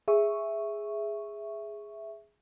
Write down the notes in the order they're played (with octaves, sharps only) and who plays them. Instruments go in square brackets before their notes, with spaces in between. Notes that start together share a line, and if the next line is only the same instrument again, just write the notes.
[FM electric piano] G#4 E5 C#6